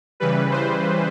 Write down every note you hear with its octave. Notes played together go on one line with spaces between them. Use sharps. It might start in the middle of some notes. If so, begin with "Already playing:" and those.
C#3 E3 G3 B4
C5